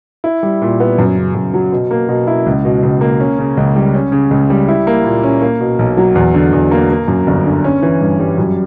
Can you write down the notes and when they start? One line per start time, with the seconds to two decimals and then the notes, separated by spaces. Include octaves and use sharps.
0.24 E4
0.43 G3
0.62 A#2
0.80 B3
0.98 F#2
1.16 C#3
1.35 F#2
1.54 F#3
1.72 B2
1.91 A#3
2.09 B2
2.27 E4
2.46 C#2
2.65 B2
2.83 C#2
3.01 A#3
3.20 C#4
3.39 C#3
3.57 C#2
3.76 G3
3.94 C#4
4.12 C#3
4.31 C#2
4.50 G3
4.68 E4
4.87 A#3
5.05 A#2
5.23 C#4
5.42 A#3
5.60 B2
5.79 B1
5.97 F#3
6.15 E2
6.34 D3
6.53 E2
6.71 A#3
6.90 A#3
7.08 F#2
7.27 G1
7.45 D3
7.64 C#4
7.82 E3
8.01 G2
8.20 G3
8.37 F#2